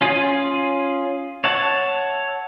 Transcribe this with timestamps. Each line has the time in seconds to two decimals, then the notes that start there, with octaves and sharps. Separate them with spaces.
0.01 C#4 F4 G#4
1.44 C#5 E5 F#5 A5